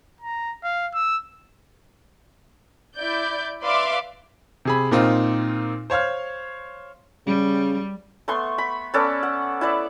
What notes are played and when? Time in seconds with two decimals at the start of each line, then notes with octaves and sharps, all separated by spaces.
0.21 A#5
0.63 F5
0.94 E6
2.96 E4 D5 G6
3.63 B4 D5 E5 F5 C6 D6
4.65 C3 G#4 B5
4.91 A#2 C4 D#4 F4
5.90 C5 C#5 F5 F6
7.26 C#3 G3
8.28 A3 B3 C6 C#6
8.58 B5
8.94 B3 C#4 A4 D5
9.23 F#5
9.61 E4 B4 D5